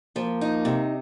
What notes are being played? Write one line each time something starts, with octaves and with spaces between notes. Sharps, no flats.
F3 A#3
D#4
C3